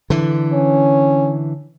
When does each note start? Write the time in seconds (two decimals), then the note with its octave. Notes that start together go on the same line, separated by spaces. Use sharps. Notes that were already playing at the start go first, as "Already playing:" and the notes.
0.10 D3 E3
0.53 C#4